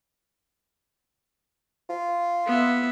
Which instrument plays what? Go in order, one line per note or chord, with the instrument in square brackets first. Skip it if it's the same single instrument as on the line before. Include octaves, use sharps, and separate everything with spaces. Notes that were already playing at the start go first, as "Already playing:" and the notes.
[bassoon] F4
[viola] B3 E5